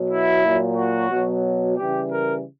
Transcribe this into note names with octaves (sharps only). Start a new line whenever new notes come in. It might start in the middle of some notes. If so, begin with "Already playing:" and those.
Already playing: B2 F#3
E4
A#2 F#3
F#4
B2 F#3
C#3 E3 G3 G4
A#4